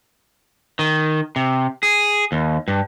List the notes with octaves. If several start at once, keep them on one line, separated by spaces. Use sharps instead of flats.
D#3
C3
G#4
D#2
G2